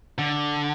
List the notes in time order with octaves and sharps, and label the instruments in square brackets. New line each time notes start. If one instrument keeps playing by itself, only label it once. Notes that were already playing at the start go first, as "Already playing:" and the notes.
[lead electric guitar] D3